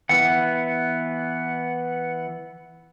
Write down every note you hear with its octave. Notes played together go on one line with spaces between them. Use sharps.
E3 B3 F#5